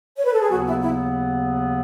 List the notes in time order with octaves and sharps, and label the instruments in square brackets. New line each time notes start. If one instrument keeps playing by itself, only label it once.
[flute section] C#5
B4
A4
G#4
[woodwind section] D#2 C#3 F#3 B3 [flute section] F#4
[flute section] E4
E4